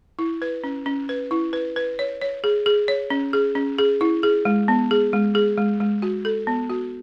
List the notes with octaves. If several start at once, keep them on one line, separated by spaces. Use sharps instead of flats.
E4
B4
C#4
C#4
B4
E4
B4
B4
C#5
C#5
G#4
G#4
C#5
C#4
G#4
C#4
G#4
E4
G#4
G#3
B3
G#4
G#3
G#4
G#3
G#3
F#4
A4
B3
F#4